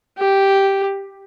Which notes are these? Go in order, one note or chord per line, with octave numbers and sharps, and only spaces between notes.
G4